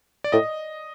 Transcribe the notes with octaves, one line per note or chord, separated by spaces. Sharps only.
D5
A2 D#5